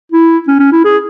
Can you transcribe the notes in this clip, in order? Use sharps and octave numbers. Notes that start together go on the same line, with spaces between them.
E4
C#4
C#4
E4
G#4